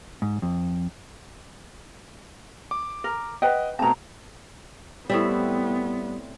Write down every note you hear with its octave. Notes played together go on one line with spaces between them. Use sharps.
G#2
F2
D6
A#4
B4 D#5 F#5 G5
B2 A3 C4 A5 A#5
A2 G3 B3 C4 E5